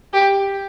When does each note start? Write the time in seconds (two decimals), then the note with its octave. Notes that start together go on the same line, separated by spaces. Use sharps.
0.13 G4